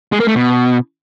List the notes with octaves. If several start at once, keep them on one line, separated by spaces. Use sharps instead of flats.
G#3
A#3
A3
B2